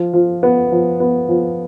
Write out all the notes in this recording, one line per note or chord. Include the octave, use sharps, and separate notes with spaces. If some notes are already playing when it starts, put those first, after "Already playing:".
Already playing: F3
F3
B3
F3
B3
F3